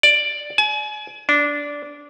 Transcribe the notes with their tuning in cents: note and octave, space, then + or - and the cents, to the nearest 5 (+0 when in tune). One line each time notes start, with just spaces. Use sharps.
D5 +5
G#5 +35
D4 -15